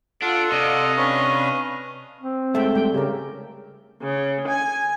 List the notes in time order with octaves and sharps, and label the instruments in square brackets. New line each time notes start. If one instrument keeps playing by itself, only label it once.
[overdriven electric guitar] D4 [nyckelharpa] F4 [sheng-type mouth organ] A4 F#5
[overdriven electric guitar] C3 [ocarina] D5 [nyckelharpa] D#5 F5
[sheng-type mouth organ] C#4 D4 B4 [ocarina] C#6
[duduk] C4
[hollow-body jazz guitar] G#2 A3 [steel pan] E5 G5
[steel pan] G3 G5
[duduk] C#3 [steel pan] G4 A#4
[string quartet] C#3
G#5